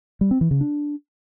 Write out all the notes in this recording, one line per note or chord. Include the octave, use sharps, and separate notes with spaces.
G3
C4
E3
C#3
D4